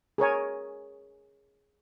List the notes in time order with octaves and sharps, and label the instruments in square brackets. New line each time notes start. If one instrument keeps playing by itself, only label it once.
[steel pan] G#4 A#4 C#5 G#5